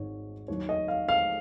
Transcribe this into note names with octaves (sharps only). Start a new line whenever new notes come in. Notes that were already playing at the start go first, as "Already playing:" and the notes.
Already playing: G#1 G#2 D#3 C#5
D#2 D#3 F#3 C#5
D#5
F5
F5